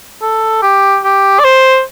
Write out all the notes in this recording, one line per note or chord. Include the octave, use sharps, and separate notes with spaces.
A4
G4
G4
D5
C5